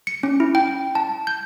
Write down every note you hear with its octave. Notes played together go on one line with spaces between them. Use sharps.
C#7
C#4
E4
G5
A5
G6